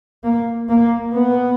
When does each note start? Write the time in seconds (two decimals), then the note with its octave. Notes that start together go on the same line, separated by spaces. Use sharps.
0.24 A#3
0.69 A#3
1.14 B3